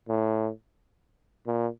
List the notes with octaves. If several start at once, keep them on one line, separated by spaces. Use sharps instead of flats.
A2
A#2